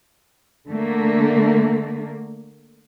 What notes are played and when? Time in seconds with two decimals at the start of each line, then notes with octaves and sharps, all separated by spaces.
0.68 D3 A3 A#3